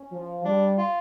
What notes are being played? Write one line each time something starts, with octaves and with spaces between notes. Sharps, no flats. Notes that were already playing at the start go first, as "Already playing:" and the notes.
Already playing: C#4
F3
G3 D4
F4